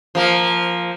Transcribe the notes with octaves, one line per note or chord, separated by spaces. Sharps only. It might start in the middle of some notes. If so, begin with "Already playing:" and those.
F3 A#3